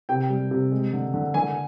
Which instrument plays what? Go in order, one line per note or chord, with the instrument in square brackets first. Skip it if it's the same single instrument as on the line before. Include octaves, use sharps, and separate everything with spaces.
[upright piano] C3 G5
G3
C3
G#3
D3
D3
D3 G#5